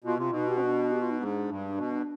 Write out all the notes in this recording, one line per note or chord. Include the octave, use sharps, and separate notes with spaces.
B2 F4
C3 F4
B2 D#4
G4
C4
D4
G4
F4
D#4
G#2 D4
G2
B2